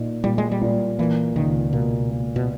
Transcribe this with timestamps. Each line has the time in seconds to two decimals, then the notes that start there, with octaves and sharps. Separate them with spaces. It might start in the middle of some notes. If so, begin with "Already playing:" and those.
Already playing: A#2 D#4
0.24 A#2 G3
0.38 G#3
0.51 G3
0.61 A#2
0.98 E3 A#3
1.36 C#2 D#3
1.73 B2 A#3
2.11 A#3
2.36 B2